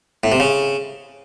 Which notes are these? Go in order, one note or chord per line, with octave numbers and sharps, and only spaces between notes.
A2
C3
C#3